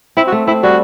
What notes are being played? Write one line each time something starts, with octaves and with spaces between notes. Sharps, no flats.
C4 E4
F#4
A3
C4 E4
G3 F#4